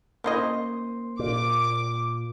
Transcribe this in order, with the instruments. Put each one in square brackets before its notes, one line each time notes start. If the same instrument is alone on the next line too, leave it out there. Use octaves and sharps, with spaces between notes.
[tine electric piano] A#3 C5 C6 [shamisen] C#4 E4 D#5
[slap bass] A#2 [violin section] D6